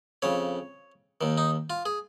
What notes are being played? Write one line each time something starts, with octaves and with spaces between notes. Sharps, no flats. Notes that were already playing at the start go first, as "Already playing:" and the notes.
F2 C#3 C#5
D#2 D#3
D#4
F4
G#4